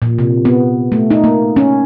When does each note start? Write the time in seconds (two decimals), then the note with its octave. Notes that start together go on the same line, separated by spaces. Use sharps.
0.02 A#2
0.19 C3
0.45 B3
0.92 A3
1.10 D#4
1.24 A#3
1.56 C#4